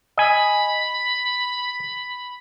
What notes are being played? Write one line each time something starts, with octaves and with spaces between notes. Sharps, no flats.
D#5 G#5 B5